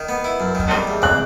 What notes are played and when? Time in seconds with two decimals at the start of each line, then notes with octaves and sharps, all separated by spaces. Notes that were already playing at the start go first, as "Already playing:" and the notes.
Already playing: D#3
0.09 B3
0.24 E4
0.40 F#2
0.55 D#3
0.71 G3
0.87 E2
1.02 C4 F#6